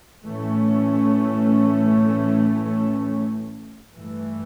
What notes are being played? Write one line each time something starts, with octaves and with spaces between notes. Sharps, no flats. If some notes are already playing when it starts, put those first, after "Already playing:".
A2 E3 A3 C#4
G2 E3 A3